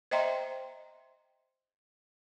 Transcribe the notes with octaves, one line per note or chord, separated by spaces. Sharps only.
C5 D#5 E5 G5 A#5 C6